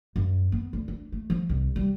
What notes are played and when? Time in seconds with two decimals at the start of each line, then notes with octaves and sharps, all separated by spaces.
0.16 F#2
0.52 B3
0.73 D2
0.88 D4
1.12 A3
1.30 F3
1.49 C2
1.76 G3